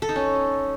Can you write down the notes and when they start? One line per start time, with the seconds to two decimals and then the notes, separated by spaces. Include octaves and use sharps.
0.02 A4
0.09 D#4
0.16 C#4